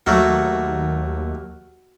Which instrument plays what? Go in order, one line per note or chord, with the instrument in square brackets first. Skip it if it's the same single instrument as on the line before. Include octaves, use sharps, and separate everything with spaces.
[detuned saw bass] D#2 [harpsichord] F#3 A3 A#3 [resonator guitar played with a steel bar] F#4